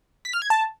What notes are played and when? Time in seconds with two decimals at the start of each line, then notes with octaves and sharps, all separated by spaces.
0.25 B6
0.33 F6
0.42 G#6
0.50 A5